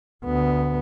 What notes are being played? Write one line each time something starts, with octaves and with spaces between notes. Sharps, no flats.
D2 B3